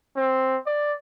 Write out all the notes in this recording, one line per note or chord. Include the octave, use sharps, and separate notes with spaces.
C4
D5